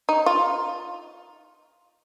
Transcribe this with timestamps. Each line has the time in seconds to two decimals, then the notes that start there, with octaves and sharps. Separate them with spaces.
0.09 D#4
0.26 F4